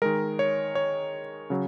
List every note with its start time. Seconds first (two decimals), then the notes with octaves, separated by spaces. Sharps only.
0.02 D#3 G#3 A#4
0.39 C#5
0.75 C#5
1.50 C#3 F#3